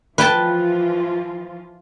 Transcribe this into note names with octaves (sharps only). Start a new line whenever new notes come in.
E3 F3 F4 B4 G5 A5